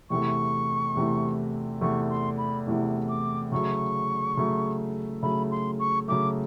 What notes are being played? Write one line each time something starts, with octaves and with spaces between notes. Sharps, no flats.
E2 C3 E3 A3 C#6
E2 C3 E3 A3
E2 C3 E3 A3 C#6
C6
B5
E2 C3 E3 A3
D6
C#3 F#3 A3 C#6
C#3 F#3 A3
C#3 F#3 A3 B5
C6
C#6
C#3 F#3 A3 D6